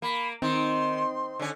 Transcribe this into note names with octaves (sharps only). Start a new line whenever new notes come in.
A#3 B5
D#3 C4 C6
D3 C#4